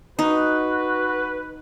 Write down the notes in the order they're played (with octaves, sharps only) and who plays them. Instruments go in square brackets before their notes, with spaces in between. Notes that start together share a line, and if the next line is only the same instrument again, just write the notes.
[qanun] D#4 [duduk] F#4 [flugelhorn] B4